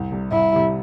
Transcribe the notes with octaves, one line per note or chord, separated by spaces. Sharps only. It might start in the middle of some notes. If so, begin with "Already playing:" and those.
Already playing: C2
C3 G3
C2 E4
C3 G3